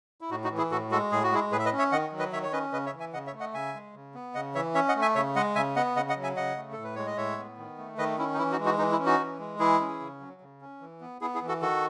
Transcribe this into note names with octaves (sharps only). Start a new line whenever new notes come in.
E4
A2 D#4 F#4
D#4 F#4
E3
E4 G#4
A2 F#4 A4
G#3 F#4 A4
A2 G#4
F#4
G#3 E4 G#4
A2 G#4 B4
E5
B4 D#5
C#4
C#5 E5
D#3 D#5 F#5
F#3
B4 D#5
D#3 C#5 E5
C#5
C#4 B4 D#5
C#3 B4 D#5
C#5 E5
E3
E5 G#5
C#3 D#5 F#5
C#5 E5
A3
D#5 F#5
C#3 E5 G#5
G#3
C#3
B3
C#3 D#5 F#5
E3 C#5 E5
C#4 C#5 E5
D#5 F#5
A3
E5 G#5
C#3 C#5 E5
G#3 D#5 F#5
C#3 E5 G#5
B3 D#5 F#5
C#3 D#5 F#5
D#5 F#5
F#3
E5 G#5
C#3 D#5 F#5
A3
A2 A4
B4
G#3 C#5
D#5
A2 C#5 E5
B3
D#3
A3
D#3 B4 D#5
C#4 E4
D#4
E3 E4
D#4 F#4
G#3
D#4 F#4
E3 D#4
E4
C#4
D#4 F#4
E3
G#3
E3 E4 G#4
C#4
C#3
F#3
C#3
C#4
E3
B3
B3 E4 G#4
E4 G#4
E3
F#4 A4
D#3 F#4 A4